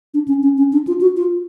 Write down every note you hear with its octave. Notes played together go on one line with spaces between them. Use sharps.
D4
C#4
C#4
C#4
D4
F4
F#4
F4